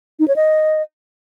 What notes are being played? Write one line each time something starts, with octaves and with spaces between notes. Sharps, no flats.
D#4
C#5
D#5